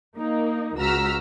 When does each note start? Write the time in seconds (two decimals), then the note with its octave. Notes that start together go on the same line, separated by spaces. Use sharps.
0.17 A#3 D#4
0.78 C#2 F#4 A#5 E6 F6 B6